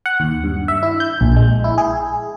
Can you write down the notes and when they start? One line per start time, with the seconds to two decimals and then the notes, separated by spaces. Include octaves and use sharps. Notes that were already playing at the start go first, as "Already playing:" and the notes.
0.06 F#5
0.20 D#2
0.44 G2
0.68 E5
0.83 E4
1.00 G6
1.21 A#1
1.36 G#3
1.64 E4
1.78 G#4